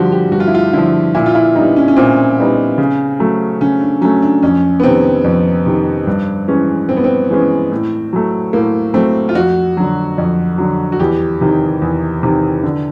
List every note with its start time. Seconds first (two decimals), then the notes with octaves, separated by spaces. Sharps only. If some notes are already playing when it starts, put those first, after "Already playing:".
Already playing: G2 D3 F3 F#4 G4
0.12 G4
0.32 G2 F#4
0.40 F4
0.47 E4
0.55 F4
0.73 D3 F3 E4
1.15 A#2 E4
1.26 F4
1.35 E4
1.55 G3 B3 D4 D#4
1.76 C#4
1.88 C#4
1.97 A#2 C4
2.38 G3 B3 D#4
2.78 C#3
3.20 F#3 A3
3.61 C#3 C#4
3.81 D4
4.01 F#3 A3 C#4
4.22 D4
4.43 F2 C#4
4.80 B3
4.83 C3 D#3 C4
5.24 F2
5.66 C3 D#3
6.07 G2
6.48 E3 G#3 C#4
6.89 G2 C4
6.97 B3
7.04 C4
7.30 E3 G#3 C#4
7.71 A2
8.13 F#3 A3
8.53 A2 A#3
8.94 F#3 A3 C4
9.29 F4
9.35 F2 F#4
9.77 D3 F#3
10.18 F2
10.58 D3 F#3
10.92 F#4
10.99 E2 G4
11.41 C3 D#3
11.82 E2
12.23 C3 D#3
12.64 D3